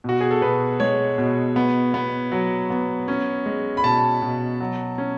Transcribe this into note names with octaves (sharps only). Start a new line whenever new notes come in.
B2 F#4
G#4
A4
B2 B4
G#3 C#5
B2
B3
B3
F#3
B3
C#4
G#3
B5
B2 A5
B2
F#3
C#4